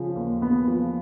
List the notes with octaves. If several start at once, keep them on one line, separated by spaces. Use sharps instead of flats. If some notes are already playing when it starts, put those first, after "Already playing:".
Already playing: C#3 F3
D#2
B3
F3